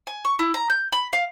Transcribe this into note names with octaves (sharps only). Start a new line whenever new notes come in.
G#5
C#6
E4
A#5
G6
B5
F5